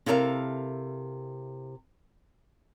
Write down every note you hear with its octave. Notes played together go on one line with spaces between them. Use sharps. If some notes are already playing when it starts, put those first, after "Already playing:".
C3 E4 A4 A#4 C#5 F5